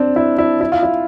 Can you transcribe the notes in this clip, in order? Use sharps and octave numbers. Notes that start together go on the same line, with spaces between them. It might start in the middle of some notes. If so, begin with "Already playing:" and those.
Already playing: C4 D4
E4
E4
E4
F4
E4